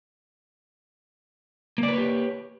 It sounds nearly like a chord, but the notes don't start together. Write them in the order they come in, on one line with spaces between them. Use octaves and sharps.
A#3 D5 B4 C#5 G4